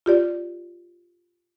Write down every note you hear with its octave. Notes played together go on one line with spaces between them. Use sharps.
F4 G4 D5